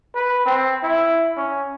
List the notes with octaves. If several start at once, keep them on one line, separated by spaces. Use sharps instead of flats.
B4
C4
E4
C#4